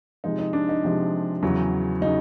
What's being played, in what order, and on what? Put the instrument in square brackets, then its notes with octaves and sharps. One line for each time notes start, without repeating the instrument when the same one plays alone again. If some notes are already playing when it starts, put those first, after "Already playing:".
[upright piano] C3 F3 G#3 D#4
D#4
D4
D#4
C3 F3 G#3
E2 C#3 F#3
C#3 F#3 D#4